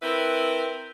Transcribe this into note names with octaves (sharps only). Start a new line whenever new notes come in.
C4 E4 A#4 B4